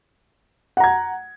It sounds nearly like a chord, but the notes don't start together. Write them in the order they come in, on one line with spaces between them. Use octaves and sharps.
F#5 A#5 G#6